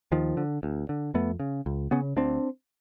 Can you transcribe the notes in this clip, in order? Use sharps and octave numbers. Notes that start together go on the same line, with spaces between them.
D#2 D#3 F3
D3
D2
D3
F2 A3 B3
C#3
C#2
C#3 B3 C#4
D2 C4 D4